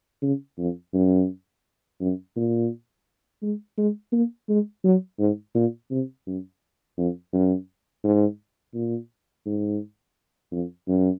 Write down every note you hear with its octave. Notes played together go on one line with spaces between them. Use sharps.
C#3
F2
F#2
F#2
A#2
G#3
G#3
A#3
G#3
F#3
G#2
A#2
C3
F#2
F2
F#2
G#2
A#2
G#2
F2
F#2